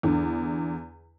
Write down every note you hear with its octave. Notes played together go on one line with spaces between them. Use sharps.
E2 D3